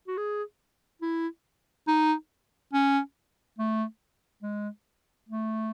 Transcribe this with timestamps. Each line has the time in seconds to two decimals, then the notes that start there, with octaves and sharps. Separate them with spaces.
0.07 F#4
0.17 G#4
1.02 E4
1.87 D#4
2.73 C#4
3.58 A3
4.43 G#3
5.29 A3